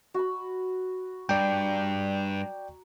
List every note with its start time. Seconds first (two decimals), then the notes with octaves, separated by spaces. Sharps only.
0.14 F#4 B5
1.29 G2 D5 G5 A#5 D6